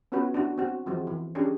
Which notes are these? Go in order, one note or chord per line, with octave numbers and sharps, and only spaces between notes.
B3 C#4 F4 F#4 B4 C#5
D4 E4 F#4
C4 F#4
E3 F3 G#3 C4 F#4
E3
C#4 D4 G4 G#4